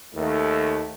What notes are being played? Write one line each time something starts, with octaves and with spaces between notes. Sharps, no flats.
D#2 A3